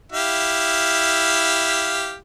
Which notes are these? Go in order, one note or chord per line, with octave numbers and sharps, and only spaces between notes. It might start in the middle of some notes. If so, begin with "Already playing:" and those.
E4 G4 F5